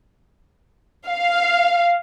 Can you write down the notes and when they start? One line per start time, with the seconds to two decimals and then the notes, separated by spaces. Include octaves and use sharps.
1.08 F5